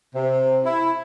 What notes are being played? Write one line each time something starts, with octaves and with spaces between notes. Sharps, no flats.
C3
E4